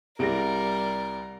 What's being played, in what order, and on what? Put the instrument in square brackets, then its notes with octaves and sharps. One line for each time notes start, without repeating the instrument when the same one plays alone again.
[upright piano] C2 D7 [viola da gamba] G3 [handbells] G4 G#4 A#6 [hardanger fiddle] A#4